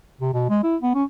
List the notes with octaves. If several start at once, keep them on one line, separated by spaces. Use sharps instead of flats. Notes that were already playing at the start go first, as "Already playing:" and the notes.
C3
B2
G#3
E4
B3
C#4